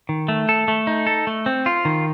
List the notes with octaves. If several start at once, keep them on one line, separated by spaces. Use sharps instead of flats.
D#3
A3
A4
A3
D#4
A4
A3
C4
F4
D#3